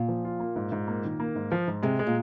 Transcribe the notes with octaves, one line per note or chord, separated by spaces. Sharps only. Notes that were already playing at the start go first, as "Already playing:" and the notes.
Already playing: A#2
F3
F4
A#3
G#2
G#2
A#3
D#3
A#3
G#2
F3
G#2
C3 G#3
G#3
A#2